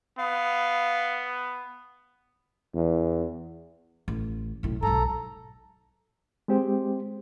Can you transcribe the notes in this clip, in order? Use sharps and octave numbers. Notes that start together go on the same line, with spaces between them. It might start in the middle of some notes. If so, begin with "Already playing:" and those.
B3 F5
E2
A1
B1 A2
B1 G#2 A4 A#5
G#3 C4 G4 C5